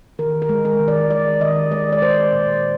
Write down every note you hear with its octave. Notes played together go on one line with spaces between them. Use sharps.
D#3 A#4
A#4
G#3
A#4
D#3
D5
G#3 D5
D#3 D#5
G#3 D5
D5
G#3 C5
A#2